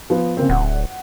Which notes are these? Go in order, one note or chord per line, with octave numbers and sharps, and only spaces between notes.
F3 B3
C#3 A#3 C4
D1 F#5